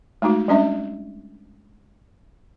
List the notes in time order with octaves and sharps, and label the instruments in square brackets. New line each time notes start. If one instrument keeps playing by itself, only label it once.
[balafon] G#3 A3 D#4 F#4
G3 G#3 C#4 D4 D#5 E5